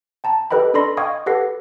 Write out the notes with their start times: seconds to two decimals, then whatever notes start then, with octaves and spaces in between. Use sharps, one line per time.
0.24 G5 A5 A#5
0.50 G4 A4 B4 D#5 G5 B5
0.74 D4 A4 D5 B5 C6 A#6
0.97 D#5 F5 G5 C#6 D#6 G#6
1.26 G4 A4 B4 F#5 A#6 C7